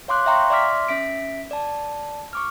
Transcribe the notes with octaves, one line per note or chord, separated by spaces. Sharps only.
C#5 F5 C6 D6 F#6
E5 F5 G5 A#5 C6 C#6
D5 E5 C6 D6 F6 B6
C#4 E5 B6 D7
D5 A5
C#6 D6 F6